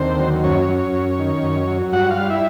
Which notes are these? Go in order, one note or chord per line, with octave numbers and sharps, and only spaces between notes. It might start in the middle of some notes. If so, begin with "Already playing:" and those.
Already playing: D#2 D3 C4 C5
F#3
F#2 C#4 C#5
F#3
F#2
D#3
F#2
F#3
G2 F#4 F#5
F4 F5
G3
E4 E5